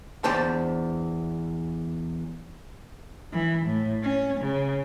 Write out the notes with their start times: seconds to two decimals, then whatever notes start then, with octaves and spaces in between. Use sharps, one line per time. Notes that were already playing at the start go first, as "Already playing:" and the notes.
0.24 E2 D4 C5 A5
3.32 E3
3.66 A2
4.03 C#4
4.40 C#3